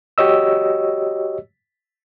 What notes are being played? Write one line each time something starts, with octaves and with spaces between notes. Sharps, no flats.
F#4 G4 C#5 D#5 E6